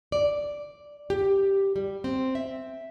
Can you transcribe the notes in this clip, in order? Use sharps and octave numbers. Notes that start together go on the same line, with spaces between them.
D5
G4
G3
C4
E5